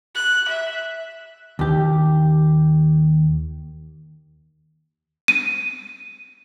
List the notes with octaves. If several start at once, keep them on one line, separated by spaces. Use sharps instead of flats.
F#6
E5
D#2 G4
D#7